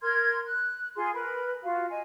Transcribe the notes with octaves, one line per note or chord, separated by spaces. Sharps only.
A#4 C6 F6 G#6
F#6
F4 G#4 C6
A#4 B4 B5
F4 F#4 F5
D#5 G#5